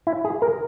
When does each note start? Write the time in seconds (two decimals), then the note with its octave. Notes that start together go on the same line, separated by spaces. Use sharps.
0.07 E4
0.25 G#4
0.42 A#4